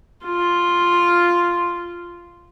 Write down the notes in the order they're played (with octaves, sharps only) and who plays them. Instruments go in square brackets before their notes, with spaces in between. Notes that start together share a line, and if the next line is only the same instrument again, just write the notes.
[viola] F4